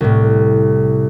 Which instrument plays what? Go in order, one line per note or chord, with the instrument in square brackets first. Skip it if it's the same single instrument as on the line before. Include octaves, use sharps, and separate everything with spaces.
[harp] C2 A2